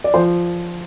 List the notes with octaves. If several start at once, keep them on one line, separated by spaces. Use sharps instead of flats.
D5
F3 C5